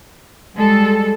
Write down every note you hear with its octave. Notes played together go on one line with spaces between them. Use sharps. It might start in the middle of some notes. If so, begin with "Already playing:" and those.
G3 G#3 A4